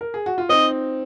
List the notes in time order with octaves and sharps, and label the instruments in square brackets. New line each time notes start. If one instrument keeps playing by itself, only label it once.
[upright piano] A#4
G#4
F#4
F4
[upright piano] C4 D#4 [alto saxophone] D#5